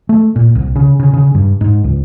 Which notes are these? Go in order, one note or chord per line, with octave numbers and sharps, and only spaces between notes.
A3
A#2
C2
C#3
C#3
C#3
G2
G#2
C#2